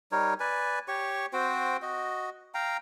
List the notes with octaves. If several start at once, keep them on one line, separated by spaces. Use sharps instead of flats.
G3 D#4 A#4 C#5
B4 D5 G#5
G4 C#5 C#6
C4 F#4 C5 G5
F#4 D#5
F5 G5 A#5